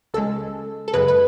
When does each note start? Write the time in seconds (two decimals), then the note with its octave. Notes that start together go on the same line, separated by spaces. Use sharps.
0.14 C#2 C#3 G#3 A4
0.88 A4
0.93 F#2 C#3 G#3 B4
1.08 B4